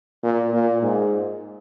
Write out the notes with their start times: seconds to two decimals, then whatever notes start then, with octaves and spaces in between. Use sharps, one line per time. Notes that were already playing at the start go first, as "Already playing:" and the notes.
0.23 A#2
0.53 A#2
0.83 G#2